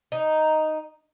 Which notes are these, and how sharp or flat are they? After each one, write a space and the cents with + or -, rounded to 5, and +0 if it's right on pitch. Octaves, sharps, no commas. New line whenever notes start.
D#4 +0